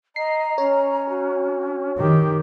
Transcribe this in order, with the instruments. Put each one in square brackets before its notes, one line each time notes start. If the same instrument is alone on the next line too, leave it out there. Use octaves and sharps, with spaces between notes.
[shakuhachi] D#5 [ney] A#5 [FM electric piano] C7
[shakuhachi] C#4 [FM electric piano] C#5
[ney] F#4
[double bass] D#3 [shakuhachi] G4